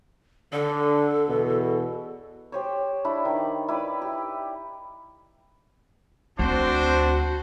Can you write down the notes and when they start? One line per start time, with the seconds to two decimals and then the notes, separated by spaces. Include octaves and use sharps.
0.53 D3 D4 A4
1.27 E2 B2
2.52 G4 C5 C#5
3.05 D4 E4 B5
3.25 D#3
3.68 E4 B4 D5
4.02 G4
6.39 D2 C4 D4 F#4 C5